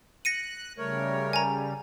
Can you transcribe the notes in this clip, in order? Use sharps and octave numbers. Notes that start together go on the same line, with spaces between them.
F#6 A#6 C#7 D#7
C#3 G3 A3 A#4 C#5
G#5 A#5